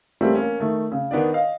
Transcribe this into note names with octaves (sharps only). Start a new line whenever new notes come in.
G3 A3 A#3 C4 C#4
A#3 C#4
D#3 A3
C#3
D#3 B3 D4 D5
D#5 F5